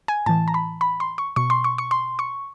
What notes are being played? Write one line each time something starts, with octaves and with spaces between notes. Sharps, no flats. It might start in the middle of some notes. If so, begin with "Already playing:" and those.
G#5
A2 E3 A5
A#5
B5
B5
C6
C#6
B2 C#6
C6
C#6
C#6
C6
C#6